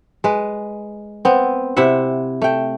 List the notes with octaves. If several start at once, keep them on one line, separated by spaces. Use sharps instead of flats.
G#3 B4
B3 C4
C3 E4 E5 F#5
A3 G5